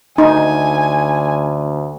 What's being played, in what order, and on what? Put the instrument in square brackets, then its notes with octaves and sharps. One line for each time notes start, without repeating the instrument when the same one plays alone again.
[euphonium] D2 [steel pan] D#4 [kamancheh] G#5